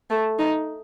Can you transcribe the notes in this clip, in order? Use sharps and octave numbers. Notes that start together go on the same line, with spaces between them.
A3
D#4